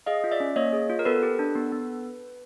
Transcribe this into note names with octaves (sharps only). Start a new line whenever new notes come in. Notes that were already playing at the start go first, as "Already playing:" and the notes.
G#4 D#5 F5
F4
D5 E5
C#4
A#3 C#5 D#5
G#4
F4
A#4
B3 A4 B4
G4
D4
B3
B3